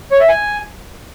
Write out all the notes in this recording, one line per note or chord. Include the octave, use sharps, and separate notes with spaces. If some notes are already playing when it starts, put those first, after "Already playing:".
C#5
E5
G#5